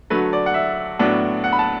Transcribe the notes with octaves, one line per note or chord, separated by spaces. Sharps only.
D3 F#3 A3 B4
D5
F#5
E5
A2 F#3 B3 D4
F#5
B5
A5